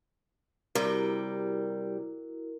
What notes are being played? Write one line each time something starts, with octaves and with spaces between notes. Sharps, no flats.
C3 G3 E4 F#4 A#4